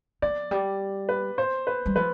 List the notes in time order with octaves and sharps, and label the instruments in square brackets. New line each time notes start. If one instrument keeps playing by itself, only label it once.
[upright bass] F3 [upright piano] D5
[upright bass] G3
[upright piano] B4
C5
B4
[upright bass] G3
[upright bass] F3 [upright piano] B4